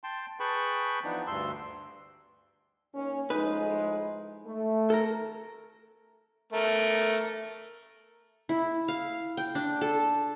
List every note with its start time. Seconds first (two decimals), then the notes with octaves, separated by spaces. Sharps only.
0.04 G5 A5 C6
0.40 G#4 B4 G5 A5 B5 C#6
1.04 E3 F3 B3 D4 D#4
1.27 D2 G2 C6 E6
2.93 D#2 C#4
3.30 A2 F3 G#3 D#4 B4
4.45 A3
4.90 A4 A#4 A#5
6.53 A3 A#4
8.49 E4
8.88 F5
9.37 G5
9.55 D4
9.81 A4